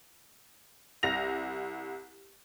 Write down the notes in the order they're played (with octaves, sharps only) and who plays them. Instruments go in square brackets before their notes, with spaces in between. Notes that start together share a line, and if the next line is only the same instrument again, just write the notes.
[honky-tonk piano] C2 A#6 F7